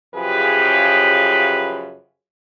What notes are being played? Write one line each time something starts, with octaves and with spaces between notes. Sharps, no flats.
F#2 C#3 F3 G4 G#4 B4